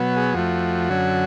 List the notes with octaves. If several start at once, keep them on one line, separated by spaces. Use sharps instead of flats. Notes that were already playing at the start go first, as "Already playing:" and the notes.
Already playing: B2 F#3 B3
G#4
F2 F3 A3 F#4
F#2 D3 F#3 C#4